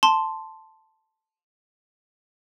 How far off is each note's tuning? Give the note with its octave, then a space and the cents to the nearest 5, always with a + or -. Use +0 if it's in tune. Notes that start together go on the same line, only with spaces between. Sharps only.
A5 +0 C6 +0